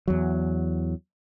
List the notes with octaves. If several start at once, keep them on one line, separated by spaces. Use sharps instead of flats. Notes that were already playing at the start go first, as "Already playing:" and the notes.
E2 F#3